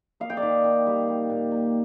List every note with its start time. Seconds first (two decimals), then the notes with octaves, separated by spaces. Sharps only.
0.20 A#3 F5
0.30 G5
0.37 D5 F5
0.42 D#3
0.64 D#3
0.86 G3
1.08 G3
1.30 A#2
1.51 A#3